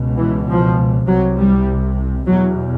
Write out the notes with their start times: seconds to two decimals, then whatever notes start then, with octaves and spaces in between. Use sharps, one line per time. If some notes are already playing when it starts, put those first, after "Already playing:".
Already playing: C#2 B2
0.18 E3
0.49 F3
1.08 C2 C3 F#3
1.38 G3
2.28 E2 B2 F#3